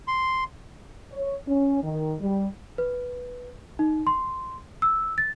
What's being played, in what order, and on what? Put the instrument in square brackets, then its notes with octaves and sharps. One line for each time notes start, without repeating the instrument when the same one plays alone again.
[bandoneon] C6
[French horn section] C#5
C#4
D#3
G3
[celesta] B4
D#4
C6
E6
A6